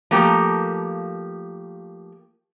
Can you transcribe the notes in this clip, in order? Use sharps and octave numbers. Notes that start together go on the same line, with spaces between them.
F3 A3 A#3 G4